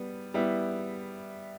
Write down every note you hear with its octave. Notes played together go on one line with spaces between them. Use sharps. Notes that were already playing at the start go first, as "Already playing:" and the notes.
Already playing: G3 B3
G3 B3 E4